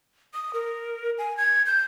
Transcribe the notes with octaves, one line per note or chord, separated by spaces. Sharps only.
D#6
A#4
G#5
G#6
G6